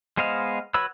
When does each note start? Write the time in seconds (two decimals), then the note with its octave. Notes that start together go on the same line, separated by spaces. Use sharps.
0.17 G#3 B3 C5 D#5 F5
0.74 F#4 B4 C#5 B5 E6